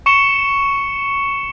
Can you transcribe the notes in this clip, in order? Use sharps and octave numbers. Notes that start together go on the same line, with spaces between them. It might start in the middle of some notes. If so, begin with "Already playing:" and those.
C#6 C#7 E7 G7